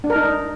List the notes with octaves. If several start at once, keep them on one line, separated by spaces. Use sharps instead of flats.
D4
A#4
D#4